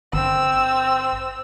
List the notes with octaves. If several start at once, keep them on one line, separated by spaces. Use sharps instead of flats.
G1 C4 E6